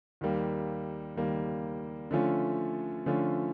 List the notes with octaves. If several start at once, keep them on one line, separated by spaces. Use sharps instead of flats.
D#2 D#3 G3 A#3
D#2 D#3 G3 A#3
D3 F3 A3 C#4 F4
D3 F3 A3 C#4 F4